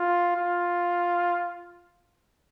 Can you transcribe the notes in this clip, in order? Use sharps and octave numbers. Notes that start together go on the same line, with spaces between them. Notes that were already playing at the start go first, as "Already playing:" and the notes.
Already playing: F4
F4